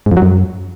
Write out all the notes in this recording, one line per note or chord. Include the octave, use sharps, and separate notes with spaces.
G#2
F2
F#3
F#2